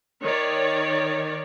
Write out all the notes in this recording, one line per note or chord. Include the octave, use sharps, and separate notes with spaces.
D#3 C#5 D5